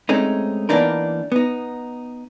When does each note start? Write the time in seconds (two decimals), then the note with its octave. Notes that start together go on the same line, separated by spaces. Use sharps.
0.09 G#3 A3 C4 C#4 D#4
0.69 E3 A#3 B3 D4 D#4 A#4
1.32 B3 D#4